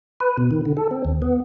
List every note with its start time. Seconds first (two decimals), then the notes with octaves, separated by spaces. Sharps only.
0.20 B4
0.38 B2
0.51 D#3
0.65 D3
0.77 A4
0.91 C4
1.05 D#2
1.22 B3